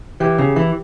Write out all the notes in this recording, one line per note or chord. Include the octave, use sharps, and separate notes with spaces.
E3 G4
C#3
E3